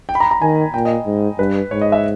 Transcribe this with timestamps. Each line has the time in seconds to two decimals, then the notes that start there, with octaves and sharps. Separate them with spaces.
0.09 G5
0.15 B5
0.20 A#5
0.31 A#5
0.42 D#3 G#5
0.74 A#2 G5
0.85 D#5
1.06 G#2
1.39 G2 B4
1.71 G#2 C#5
1.81 D#5
1.92 E5